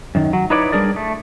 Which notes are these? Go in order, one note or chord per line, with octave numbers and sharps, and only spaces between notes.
F#2 D#3
F#3
D#4 E4 B4 C#5 D5
G3 D4 G#4 A#4 D5
A3